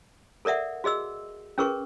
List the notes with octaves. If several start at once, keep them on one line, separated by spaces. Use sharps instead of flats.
A4 A#4 D5 E5 F#5
F#4 G#4 D#5 E6
C#4 G#4 A#4 B4 C#6